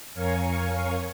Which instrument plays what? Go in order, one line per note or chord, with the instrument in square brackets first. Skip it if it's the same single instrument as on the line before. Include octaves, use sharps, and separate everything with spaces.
[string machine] F2 A#4 C#5 F5 G#5 C#6